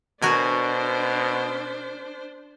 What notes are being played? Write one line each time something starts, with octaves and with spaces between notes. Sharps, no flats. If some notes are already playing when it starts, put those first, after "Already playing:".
B2 D4 F#4 A#4 C5 G#5